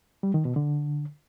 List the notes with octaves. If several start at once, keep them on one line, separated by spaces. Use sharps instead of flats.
G3
D#3
B2
D3